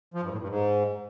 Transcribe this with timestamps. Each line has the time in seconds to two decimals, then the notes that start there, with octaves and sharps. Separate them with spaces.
0.14 F3
0.23 G2
0.31 A2
0.40 G2
0.48 G#2